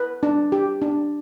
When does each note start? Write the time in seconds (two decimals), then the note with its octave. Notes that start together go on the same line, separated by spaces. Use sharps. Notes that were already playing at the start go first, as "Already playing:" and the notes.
Already playing: B4
0.23 D4
0.52 G4
0.82 D4